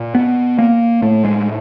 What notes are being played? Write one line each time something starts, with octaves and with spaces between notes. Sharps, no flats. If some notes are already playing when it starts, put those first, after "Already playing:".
Already playing: A#2
B3
A#3
A2 A3
G#3